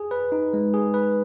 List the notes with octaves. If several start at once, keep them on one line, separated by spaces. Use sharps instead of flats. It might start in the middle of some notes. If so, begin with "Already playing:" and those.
Already playing: G#4
B4
D#4
G#3
G#4
B4